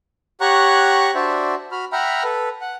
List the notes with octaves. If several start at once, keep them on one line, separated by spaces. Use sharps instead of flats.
G4 C#5 F#5 A#5 C#6 F#6
D4 F#4 C5 D5 E5
F#4 B5 F6
E5 F#5 G5 A#5 B5 F6
A4 B4
F#5